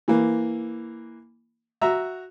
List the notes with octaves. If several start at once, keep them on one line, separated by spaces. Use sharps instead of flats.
E3 A#3
F#4 E5 A#5